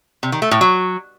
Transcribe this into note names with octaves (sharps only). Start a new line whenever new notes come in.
C3
D#3
A3
A2
F#3